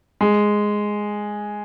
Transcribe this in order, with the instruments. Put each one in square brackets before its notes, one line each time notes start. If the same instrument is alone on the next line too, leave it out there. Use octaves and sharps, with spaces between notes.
[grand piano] G#3